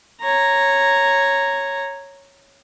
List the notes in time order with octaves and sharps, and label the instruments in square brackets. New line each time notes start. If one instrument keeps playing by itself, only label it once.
[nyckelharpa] C#5 A#5